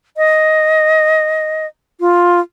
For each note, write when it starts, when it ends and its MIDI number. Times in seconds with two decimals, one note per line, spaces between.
0.17 1.66 75
2.00 2.40 65